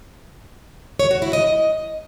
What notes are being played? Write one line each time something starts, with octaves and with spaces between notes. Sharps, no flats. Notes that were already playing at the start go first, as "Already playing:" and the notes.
C#5
F#4
E4
D#5